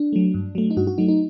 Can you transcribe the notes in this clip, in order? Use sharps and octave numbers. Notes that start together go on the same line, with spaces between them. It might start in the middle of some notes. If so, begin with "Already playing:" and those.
Already playing: D4
F#3 A3
G2
F#3 A3
D#4
G2 F#4
F#4
F#3 A3 D#4
D#4